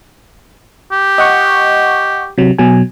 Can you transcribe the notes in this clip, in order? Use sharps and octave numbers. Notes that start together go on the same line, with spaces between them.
G4
D#5 F#5 C#6
C3 F#3
B2 F#3 G#5